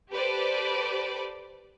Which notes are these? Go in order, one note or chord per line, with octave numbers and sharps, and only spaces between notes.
G4 A4 B4 C5 D5